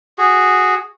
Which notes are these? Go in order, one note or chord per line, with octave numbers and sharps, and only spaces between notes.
F#4 G#4